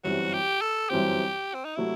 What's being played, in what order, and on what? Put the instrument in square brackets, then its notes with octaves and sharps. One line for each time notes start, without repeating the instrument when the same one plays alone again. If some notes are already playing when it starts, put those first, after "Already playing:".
[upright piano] G1 F#2 E3 G3 C4 [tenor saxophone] F#4
[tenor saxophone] G4
A4
[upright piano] G1 F#2 E3 G3 C4 [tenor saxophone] G4
[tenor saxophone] C4
D#4
[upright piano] C3 F#3 A3 [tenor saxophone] E4